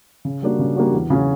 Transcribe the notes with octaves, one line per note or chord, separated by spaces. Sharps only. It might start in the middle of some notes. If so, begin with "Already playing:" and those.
C#3
G3 A#3 D4 F#4
C#3
G3 A#3 D4 F#4
E2
C#3 F#3 C#4 F#4